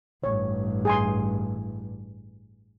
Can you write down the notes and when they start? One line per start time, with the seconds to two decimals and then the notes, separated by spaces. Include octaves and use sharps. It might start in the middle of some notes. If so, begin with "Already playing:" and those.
0.24 A1 G2 C#5
0.85 G#4 G#5 C6